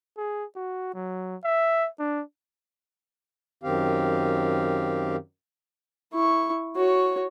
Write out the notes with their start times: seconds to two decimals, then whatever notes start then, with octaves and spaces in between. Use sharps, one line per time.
0.17 G#4
0.55 F#4
0.94 F#3
1.44 E5
1.99 D4
3.63 F#2 D#3 C4 G4 F5
6.13 E4 C#6
6.75 F#4 C#5